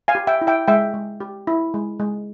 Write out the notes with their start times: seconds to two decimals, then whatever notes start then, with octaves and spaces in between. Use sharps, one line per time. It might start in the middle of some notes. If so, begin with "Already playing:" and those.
0.08 F5 G#5
0.15 G4
0.27 E5 G5
0.41 E4
0.47 E5 G5
0.68 G#3 E5 G5
0.94 G#3
1.20 G4
1.47 E4
1.74 G#3
1.99 G#3